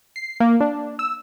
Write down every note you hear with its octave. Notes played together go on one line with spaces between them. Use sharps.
C7
A#3
D4
E6